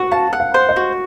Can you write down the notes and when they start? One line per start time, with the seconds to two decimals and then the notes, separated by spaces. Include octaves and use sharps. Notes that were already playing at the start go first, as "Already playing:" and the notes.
Already playing: F#4 F#5
0.12 F5 A5
0.33 F#5
0.40 F5
0.54 C5
0.69 D#5
0.76 F#4